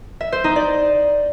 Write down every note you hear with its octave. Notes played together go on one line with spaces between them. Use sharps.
E5
C5
D#4
D5